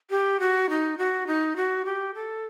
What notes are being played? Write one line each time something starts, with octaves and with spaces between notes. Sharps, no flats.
G4
F#4
D#4
F#4
D#4
F#4
G4
A4